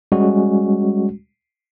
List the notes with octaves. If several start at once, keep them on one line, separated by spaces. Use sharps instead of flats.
G3 G#3 C#4 F#4